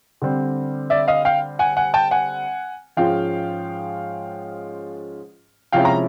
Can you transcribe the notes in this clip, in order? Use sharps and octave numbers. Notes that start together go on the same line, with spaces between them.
D3 G3 C4
D5 E5
D#5 F5
F5 G5
F#5 G#5
F#5 G#5
G5 A5
F#5 G#5
G#2 F3 G#3 C#4 F4 F5 G5
C3 F3 G#3 C#4 E4 F5 G5
A#5